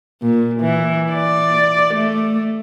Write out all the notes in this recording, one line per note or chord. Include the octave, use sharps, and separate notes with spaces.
A#2
E3
D5
A3